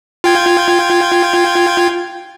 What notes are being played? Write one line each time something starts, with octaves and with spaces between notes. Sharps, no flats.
F4 G5 G#6